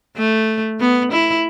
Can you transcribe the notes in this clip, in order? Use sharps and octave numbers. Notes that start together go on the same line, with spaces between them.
A3
B3
E4